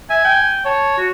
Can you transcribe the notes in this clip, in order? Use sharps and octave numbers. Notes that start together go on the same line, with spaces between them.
E5 G#5
G5
C#5 A5
F#4